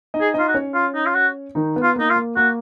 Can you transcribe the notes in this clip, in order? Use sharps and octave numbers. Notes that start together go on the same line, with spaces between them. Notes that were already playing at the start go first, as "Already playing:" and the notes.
D#4 D#5
G#4
D#4 F4 D#5
F#4
C#4 C#5
F4
D#4
F4
F#4
D#3 D#4
B3
F4
A#3 D#4
F4
A#3
A#3 F#4